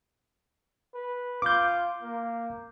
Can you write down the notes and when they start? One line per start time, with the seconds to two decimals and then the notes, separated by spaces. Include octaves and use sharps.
0.94 B4
1.42 F4 D6 G6
2.02 A#3